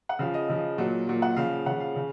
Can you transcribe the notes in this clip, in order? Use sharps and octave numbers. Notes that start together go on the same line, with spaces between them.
F#5
C#3 F3 F5
D#5
C#3 F3
A#2 F#3
A#2 F#3
F#5
C#3 F3 F5
C#3 F3 F#5
F5
C#3